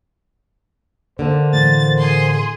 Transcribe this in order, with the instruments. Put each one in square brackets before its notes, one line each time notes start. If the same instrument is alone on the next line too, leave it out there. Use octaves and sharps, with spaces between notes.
[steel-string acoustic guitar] D3 A#3 A5 [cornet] C5
[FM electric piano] A2 E3 A#4 [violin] A6
[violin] G#4 C6